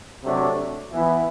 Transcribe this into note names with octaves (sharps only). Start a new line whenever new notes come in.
C3 F#3 A3 D4
E3 B3 E4